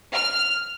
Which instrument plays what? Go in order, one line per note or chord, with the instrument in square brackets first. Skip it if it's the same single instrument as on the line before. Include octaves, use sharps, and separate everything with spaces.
[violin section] F6